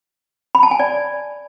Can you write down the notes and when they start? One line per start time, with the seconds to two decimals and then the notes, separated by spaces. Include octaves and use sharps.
0.55 B5
0.63 A5
0.71 G#5
0.80 D5